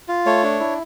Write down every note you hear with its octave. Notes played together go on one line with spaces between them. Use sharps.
F4
A3 C#5
D4
E4